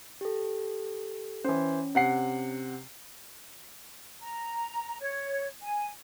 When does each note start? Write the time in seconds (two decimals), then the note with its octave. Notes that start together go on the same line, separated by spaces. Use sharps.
0.21 G4 A4
1.44 E3 C#4 C5
1.95 C3 F#5 C7
4.21 A#5
5.00 C#5
5.62 G#5